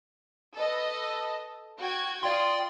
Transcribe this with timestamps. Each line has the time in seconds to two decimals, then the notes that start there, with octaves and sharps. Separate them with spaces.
0.56 A4 B4 D#5
1.77 F#4 G5 G#6
2.23 F4 D5 G5 C6 D#6